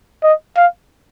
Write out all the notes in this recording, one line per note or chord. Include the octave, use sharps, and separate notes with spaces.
D#5
F5